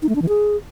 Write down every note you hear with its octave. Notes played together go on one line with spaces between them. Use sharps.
D#4
A3
D4
E3
G#4